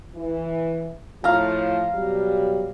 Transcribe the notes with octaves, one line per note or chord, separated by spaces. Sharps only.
E3
A2 F3 F5 A#5
B2 F#3 G3